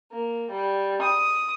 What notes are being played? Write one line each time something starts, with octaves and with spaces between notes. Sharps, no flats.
A#3
G3
D#6